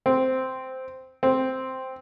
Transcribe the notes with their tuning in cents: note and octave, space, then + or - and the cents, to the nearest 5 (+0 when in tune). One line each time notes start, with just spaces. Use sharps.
C4 -5
C4 +0